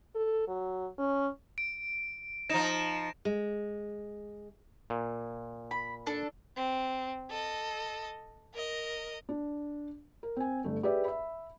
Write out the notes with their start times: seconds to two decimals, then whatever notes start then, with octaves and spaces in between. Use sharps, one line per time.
0.15 A4
0.48 F#3
0.98 C#4
1.58 D7
2.50 F3 D#4 A#6 E7
3.25 G#3
4.90 A#2
5.71 B5
6.07 D4 A4
6.56 C4
7.30 A4 D#5
8.54 A#4 D#5
9.29 D4
10.23 A#4
10.36 C4 G#5
10.64 G1 A3
10.83 G4 G#4 B4 D5 E5
11.04 E5 B5